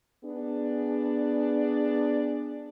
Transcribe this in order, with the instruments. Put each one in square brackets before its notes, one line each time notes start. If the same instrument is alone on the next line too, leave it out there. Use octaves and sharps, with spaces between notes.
[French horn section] B3 D4 G#4